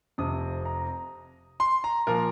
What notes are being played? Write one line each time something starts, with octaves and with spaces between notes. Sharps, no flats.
F1 F2 C3 D#6
A#5
C6
A#5
A#2 F3 A#4